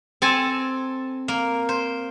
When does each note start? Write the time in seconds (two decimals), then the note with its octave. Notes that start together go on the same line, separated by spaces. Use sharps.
0.22 C4 A4 G#5 A5
1.28 A#3
1.69 C5